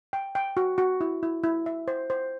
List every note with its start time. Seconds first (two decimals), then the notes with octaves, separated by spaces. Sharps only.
0.13 G5
0.35 G5
0.57 F#4
0.78 F#4
1.01 E4
1.23 E4
1.43 E4
1.66 E5
1.88 C5
2.10 C5